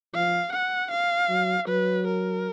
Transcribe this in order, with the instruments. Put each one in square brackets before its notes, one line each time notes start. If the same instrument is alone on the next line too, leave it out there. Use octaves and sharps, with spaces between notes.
[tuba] F3 [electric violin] F5
[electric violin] F#5
F5
[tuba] F#3
[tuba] F#3 [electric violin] B4
[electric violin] A#4